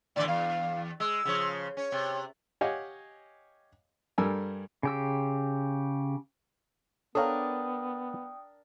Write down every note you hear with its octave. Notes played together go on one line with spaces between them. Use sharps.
A2 D3 E3 D5
E2 F5
G#3 E6
C#3 F3 C#5
C#4 C#5
C3
G4 C#5 D#5 F5 F#5 G#5
G2 G3 A4 A#4 G#5 E6
C#3 G4 E6
B3 D4 A4 A#4 C#5 F5 G5 D#6